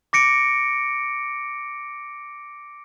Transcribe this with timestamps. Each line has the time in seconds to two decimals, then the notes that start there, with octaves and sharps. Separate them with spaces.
0.13 D6 A#6 C#7 D7